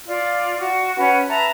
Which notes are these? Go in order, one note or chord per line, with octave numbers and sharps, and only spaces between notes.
F4 D5
F#4
C#4 B4 F#5
B4 E5 A5 A#5